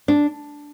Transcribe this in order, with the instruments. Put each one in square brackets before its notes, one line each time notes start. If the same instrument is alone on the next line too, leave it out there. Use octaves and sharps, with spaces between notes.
[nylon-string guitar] D4